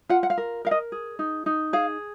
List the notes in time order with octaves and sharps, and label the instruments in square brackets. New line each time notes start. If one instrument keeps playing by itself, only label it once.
[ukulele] F4 F#5
F#5
F5
A#4
A#4 F5
D#5
G#4
D#4
D#4
G#4 F5